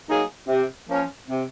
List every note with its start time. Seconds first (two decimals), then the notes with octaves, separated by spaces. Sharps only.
0.08 F#3 A#3 D#4 G#4
0.48 C3
0.88 F3 A#3 C#4
1.29 C3